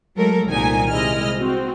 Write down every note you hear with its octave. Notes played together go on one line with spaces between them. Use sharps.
F#3 G#3 A3 A4 A#4
C2 A#2 D#3 D#4 A#4 G#5
C3 G#3 E4 D#5 F6
C4 F#4